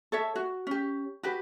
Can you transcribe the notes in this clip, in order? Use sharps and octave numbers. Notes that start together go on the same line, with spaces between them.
A4 C#5 E5
F#4
C#4 G4
F#4 G4 B4